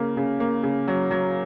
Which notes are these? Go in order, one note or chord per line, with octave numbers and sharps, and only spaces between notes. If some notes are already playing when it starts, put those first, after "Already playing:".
Already playing: C#3 A#3
C#3
A#3
C#3
F#3
F#3